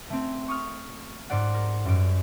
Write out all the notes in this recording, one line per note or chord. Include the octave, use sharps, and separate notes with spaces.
A3 C4
C#6 D#6 F6
G#2 C5 D5 F#5
A#4
F#2 G3 D7